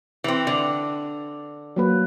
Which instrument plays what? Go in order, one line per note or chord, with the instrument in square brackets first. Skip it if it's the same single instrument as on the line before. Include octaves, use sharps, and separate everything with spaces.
[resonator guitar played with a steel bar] E3 C4
D3
[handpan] F#3 A#3 B4